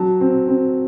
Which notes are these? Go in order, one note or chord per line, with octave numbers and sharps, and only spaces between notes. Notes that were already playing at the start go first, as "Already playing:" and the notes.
Already playing: F#3 A5
C4
C4